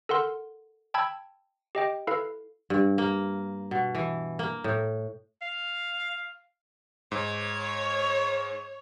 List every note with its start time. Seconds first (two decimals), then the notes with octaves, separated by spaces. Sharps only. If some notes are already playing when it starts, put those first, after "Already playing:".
0.09 A4 A#4 F#5 C6
0.94 G5 A5 B5 E6 G#6
1.75 G4 D#5 G5
2.07 E4 A4 B4 F5
2.70 G2
2.98 A#3
3.71 B2
3.95 E3
4.39 A#3
4.64 A2
5.42 F5
7.12 G#2 C#5